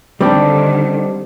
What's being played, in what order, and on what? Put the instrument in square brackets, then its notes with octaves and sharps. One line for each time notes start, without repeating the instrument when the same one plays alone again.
[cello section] D3 D#3 [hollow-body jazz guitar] G3 C4 D4